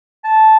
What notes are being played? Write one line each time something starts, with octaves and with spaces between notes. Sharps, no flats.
A5